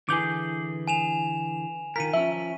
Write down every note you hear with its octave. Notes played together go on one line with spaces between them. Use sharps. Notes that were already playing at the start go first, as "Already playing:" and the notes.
D3 E3 G#4 D6 G6
G#5 E7 F7
D#3 F4 A#4 B6 D#7
F3 C#4 E5